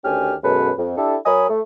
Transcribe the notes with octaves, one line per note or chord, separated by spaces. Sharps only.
D2 D#3 C#4 G4 G#5 F6
F#2 B2 G#3 C#4 A4 B4
F2
D4 E4 G4 A4
F#3 A#4 C#5 G#5 B5 D#6
A3